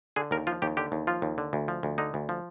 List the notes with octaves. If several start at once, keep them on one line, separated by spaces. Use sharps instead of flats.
D3 G#4
D#2 A#4
F3 F4
D#2 G4
D3 G4
D#2
F3 F4
D#2
D3
D2
F3
D2
D3 D#4
D2
F3